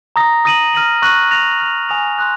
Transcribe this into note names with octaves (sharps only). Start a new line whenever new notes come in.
A#5 D#6 A#6
D#6 A#6 D#7 F#7
F6 A#6 D#7 F#7
C#6 F#6 A#6 D#7 F#7
F#6 A#6 F7
F6 A#6 F7
G#5 D#6 A#6 F7
C6 D#6 F#6